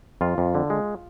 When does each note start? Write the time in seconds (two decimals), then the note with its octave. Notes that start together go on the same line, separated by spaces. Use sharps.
0.21 F2 F4
0.38 F2
0.55 D3
0.70 G#3